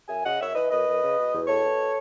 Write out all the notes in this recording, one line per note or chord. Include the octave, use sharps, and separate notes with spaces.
F#2 E5 G#5
C#3 D#5 F#5
F#2 C#5 E5
E3 B4 D#5
F#2 B4 D#5
F#2
C#3
B2
E2
B2 A4 C#5
B2